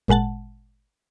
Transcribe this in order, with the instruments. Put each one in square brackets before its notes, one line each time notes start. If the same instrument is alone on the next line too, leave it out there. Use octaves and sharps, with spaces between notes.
[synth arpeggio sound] G#1 A#2 G#3 F#5 A5